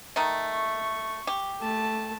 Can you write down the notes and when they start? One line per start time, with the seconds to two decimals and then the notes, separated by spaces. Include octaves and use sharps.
0.16 D#3 A3
0.54 C#6
1.27 G4
1.61 A3 A5